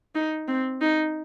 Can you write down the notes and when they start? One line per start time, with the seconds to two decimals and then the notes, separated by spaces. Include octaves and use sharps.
0.15 D#4
0.48 C4
0.81 D#4